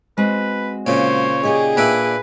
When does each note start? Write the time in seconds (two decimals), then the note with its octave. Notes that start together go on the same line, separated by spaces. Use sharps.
0.18 G#3 C4 F#4 B4
0.87 A#2 C#3 C5 C#5
1.43 D#4 G4 G#4 D5
1.77 A#2 D4 B4 E5